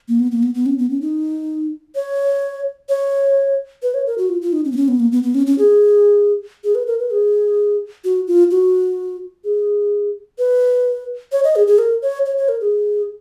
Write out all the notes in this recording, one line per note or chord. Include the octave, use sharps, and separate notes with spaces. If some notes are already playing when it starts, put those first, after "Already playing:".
A#3
B3
A#3
B3
B3
C#4
B3
C#4
D#4
C#5
C#5
B4
C#5
A#4
F#4
F4
F4
D#4
C#4
B3
C#4
B3
A#3
B3
B3
C#4
C#4
G#4
G#4
B4
A#4
B4
G#4
F#4
F4
F#4
G#4
B4
C#5
D#5
G#4
G#4
A#4
C#5
C#5
C#5
A#4
G#4